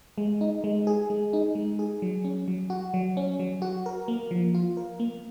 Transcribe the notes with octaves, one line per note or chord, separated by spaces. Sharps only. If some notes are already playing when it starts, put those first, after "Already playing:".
G#3
D#4
G#3
G#4
G#3
D#4
G#3
G#4
F#3
C#4
F#3
F#4
F#3
C#4
F#3
F#4
A#4
A#3
F3
F4
A#4
A#3